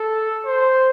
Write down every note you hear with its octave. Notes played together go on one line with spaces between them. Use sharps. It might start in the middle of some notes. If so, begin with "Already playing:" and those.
Already playing: A4
C5